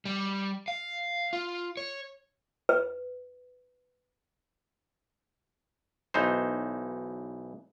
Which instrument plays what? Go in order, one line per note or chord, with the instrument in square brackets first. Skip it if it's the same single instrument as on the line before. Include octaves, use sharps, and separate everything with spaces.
[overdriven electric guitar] G3
F5
F4
C#5
[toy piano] B4
[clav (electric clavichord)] B1 E3 D#4 C5